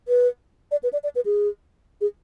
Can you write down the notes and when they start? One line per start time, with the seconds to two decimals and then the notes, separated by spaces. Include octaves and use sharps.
0.08 B4
0.71 D5
0.83 B4
0.93 D5
1.04 D5
1.15 B4
1.26 G#4
2.01 G#4